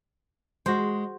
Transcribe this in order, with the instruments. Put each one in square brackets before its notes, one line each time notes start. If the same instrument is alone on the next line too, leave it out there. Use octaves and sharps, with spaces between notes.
[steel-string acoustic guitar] G#3 [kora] F#4 C5